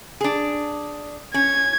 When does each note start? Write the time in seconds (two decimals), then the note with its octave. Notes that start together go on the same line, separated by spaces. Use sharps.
0.21 D4 G#4
1.34 C#4 G#6